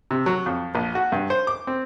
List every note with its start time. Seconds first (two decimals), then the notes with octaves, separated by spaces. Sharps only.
0.11 C3
0.26 F#3
0.46 F2
0.75 A#1
0.95 F#4
1.12 G2
1.30 C5
1.47 D6
1.67 C4